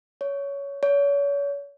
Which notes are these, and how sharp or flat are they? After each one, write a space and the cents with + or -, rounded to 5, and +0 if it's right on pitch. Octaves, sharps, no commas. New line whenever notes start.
C#5 +15
C#5 +35